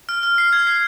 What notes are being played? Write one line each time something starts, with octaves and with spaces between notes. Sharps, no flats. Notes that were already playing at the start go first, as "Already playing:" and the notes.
F6
F6
C7
G#6
C7